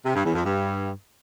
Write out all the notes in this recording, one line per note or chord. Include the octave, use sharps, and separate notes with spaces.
C3
G2
E2
F2
G2